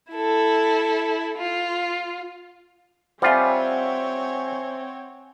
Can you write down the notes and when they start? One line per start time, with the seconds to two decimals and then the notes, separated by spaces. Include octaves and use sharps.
0.12 E4 A4
1.38 F4
3.22 G3 C4 F4 C5 C#5 E5 F#5 G#5